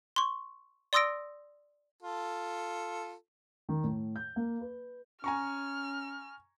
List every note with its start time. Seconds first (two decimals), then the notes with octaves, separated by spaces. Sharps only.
0.16 C6 C#6
0.93 D5 C6 D#6 E6 A#6 D7
2.03 F4 A4
3.69 D#3
3.84 A2
4.16 G6
4.36 A#3
4.61 B4
5.24 C#4 G#5 A#5 C#6 F6